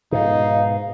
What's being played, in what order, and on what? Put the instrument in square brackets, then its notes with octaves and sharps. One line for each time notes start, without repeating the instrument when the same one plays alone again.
[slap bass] G#2 B2 [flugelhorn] D#4 [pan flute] F5